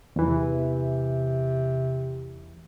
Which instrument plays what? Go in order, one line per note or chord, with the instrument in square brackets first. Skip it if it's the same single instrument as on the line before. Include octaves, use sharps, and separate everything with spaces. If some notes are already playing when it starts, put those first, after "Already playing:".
[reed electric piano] E2 E3 [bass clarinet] C3